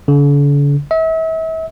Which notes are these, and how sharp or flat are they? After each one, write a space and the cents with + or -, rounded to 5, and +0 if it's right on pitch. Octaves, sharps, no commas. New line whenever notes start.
D3 -45
E5 -35